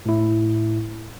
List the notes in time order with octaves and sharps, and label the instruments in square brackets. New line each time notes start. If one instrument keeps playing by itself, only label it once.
[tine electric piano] A2 E4